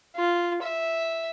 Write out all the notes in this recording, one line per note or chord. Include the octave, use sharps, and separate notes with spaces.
F4
E5